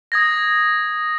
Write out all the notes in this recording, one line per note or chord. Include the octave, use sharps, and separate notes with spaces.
D#6 G#6 A#6